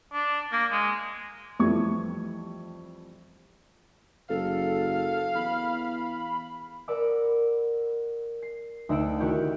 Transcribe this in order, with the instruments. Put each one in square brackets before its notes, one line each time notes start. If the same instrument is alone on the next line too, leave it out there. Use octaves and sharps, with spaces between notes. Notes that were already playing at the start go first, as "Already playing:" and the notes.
[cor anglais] D4
A#3
G#3
[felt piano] F2 E3 G3 A3 C#6 G#6
[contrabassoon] F#1 [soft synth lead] A4 [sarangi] F5
[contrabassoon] E2 [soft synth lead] B5
[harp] A#4 D5 F#5 B5 D6 E6
C7
D2 D#4 A4 F#5 E6 D7
D#3 E4 F#4 G4 F#5 G6